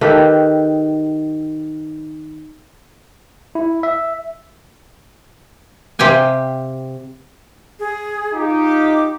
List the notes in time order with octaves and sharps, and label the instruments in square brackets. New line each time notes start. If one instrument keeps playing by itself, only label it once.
[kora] D#3 G4 A4 B4
[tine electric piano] E4
E5
[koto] C3 G4 F5 G5 G#5
[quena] G#4
[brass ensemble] D#4 F4 G4
[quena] D6